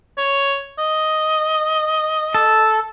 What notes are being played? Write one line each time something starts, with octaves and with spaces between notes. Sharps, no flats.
C#5
D#5
A4